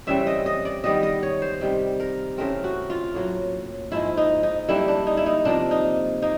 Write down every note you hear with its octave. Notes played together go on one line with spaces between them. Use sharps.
C#3 E3 G3 C4 E5
D#5
D#5
D5
D#3 G3 B3 D#5
D#5
C#5
C5
C3 D#3 G3
A#4
C#3 E3 A3 C4 A#4
F#4
F4
A2 F#3 A#3
G#2 F3 G#3 E4
D#4
D#4
D3 G3 A#3 D4 E4
D4
D#4
E4
D#4
C3 F3 A#3 D4
D#4
A#3 D#4